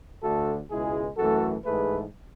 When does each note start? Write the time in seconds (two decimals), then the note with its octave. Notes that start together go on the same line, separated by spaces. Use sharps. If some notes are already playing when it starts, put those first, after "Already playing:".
0.22 D2 D3 A3 F#4 A4
0.70 C#2 B2 G#3 E4 G#4
1.17 F#2 E3 A3 F#4 A4
1.65 G#2 E3 A3 G#4 B4